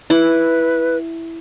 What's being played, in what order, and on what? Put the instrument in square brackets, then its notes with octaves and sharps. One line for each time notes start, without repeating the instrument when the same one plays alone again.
[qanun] E4 [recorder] B4